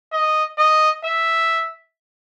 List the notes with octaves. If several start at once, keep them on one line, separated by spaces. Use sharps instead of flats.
D#5
D#5
E5